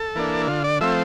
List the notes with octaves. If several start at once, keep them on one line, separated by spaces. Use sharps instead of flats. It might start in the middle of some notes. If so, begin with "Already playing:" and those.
Already playing: A4
E3 A#3 D4
D3 F4
D5
F3 A3 C4 E5